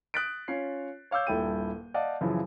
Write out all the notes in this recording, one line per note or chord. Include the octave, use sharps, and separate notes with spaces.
D#6 F#6 G6 A6 B6 D7
C#4 F4 C#5 C7
C#5 F5 D6 E6 G6
D#1 G2 E4 A4 G5 D#7
D5 D#5 F5 F#5 A5
F#2 C#3 E3 F3 E4